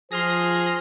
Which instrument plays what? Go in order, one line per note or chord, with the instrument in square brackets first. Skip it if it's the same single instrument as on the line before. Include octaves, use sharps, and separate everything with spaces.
[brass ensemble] F3 C5 [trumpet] G#4 [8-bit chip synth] C6 F6 A#6